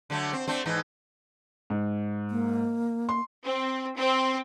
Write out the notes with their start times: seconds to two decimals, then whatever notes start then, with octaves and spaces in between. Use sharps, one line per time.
0.10 D3 F#3 A3
0.33 C4
0.48 A3 C4 D4
0.65 G#2 E3 D#4
1.70 G#2
2.31 A#3
3.09 C6
3.44 C4
3.96 C4